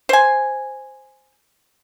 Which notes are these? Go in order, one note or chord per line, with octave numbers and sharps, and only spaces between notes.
C5 G#5